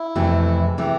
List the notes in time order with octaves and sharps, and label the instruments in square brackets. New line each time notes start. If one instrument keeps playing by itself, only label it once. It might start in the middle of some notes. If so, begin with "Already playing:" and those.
Already playing: [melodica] E4
[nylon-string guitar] F2 C3 E3 A3
[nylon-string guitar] C3 E3 A3 [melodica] G4